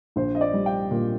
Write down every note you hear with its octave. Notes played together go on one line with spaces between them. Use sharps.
A#1 C5
D#5
D5
G3
G5
A#2